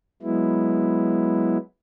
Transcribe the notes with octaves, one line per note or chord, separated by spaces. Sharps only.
F#3 G#3 B3 E4